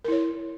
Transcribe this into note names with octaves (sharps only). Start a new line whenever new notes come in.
E4 A#4 C#5